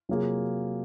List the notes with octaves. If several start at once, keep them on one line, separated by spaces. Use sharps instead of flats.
C3 F#3 A#3 F4 G#4